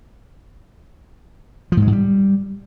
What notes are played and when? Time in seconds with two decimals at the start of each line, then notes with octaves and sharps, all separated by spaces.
1.72 F3
1.77 G#2
1.82 G#3
1.87 G#2
1.92 G3